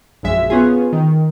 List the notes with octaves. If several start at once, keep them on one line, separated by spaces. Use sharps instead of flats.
A#1 F#2 G#3 E5
B3 C#4 F4 G#4
D#3